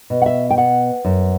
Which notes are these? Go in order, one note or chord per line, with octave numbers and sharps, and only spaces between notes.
B2
F#5
E5
G5
B3 F#5
F#2